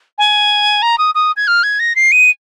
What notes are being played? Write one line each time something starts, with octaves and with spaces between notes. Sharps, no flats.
G#5
A#5
D#6
D#6
G#6
F6
G#6
A#6
C7
D#7